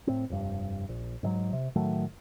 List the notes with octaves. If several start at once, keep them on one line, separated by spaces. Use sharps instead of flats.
A2 C4
F1 G2
A#1
G#2 E3 F#3
C3
A2 D#3 F#3 A3